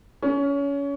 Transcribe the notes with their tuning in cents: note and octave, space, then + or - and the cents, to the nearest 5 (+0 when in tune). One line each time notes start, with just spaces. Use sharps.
C#4 +25